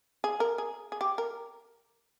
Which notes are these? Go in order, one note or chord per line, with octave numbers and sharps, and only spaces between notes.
G#4
A#4
G#4
G#4
G4
A#4